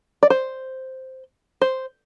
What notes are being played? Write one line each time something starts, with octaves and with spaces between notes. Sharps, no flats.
D5
C5
C5